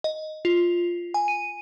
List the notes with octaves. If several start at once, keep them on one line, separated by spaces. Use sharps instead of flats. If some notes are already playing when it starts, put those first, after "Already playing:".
D#5
F4
G#5
D#7